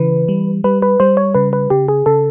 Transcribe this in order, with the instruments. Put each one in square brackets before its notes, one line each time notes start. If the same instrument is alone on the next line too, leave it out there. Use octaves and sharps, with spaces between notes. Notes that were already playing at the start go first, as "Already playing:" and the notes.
Already playing: [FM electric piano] C#3 E3 B4
G3
G3 B4
B4
G3 C5
C#5
C#3 B4
B4
C#3 G4
G#4
C#3 A4